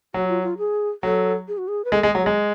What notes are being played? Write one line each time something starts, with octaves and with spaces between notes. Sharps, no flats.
F#3 F#4
F4
F4
G#4
F#3 A4
G#4
F#4
G#4
B4
G#3 A4
G#3
G#4
F#3
G#3 G#4